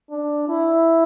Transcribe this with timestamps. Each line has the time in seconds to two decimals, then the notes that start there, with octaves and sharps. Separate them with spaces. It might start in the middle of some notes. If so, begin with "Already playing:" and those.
0.10 D4
0.48 E4